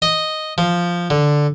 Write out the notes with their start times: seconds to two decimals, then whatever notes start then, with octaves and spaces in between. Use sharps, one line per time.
0.02 D#5
0.58 F3
1.10 D3